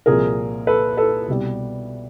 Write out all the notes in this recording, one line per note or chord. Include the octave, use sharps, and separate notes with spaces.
C2 A#2 F3 G#4 A#4
A4 B4
A4 B4
C2 B2 G3